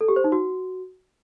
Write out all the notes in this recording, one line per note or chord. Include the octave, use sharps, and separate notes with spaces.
A4
G4
C5
D#4
F#4